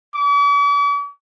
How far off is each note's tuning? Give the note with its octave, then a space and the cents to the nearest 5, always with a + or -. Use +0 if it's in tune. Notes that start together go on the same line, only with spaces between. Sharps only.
D6 -45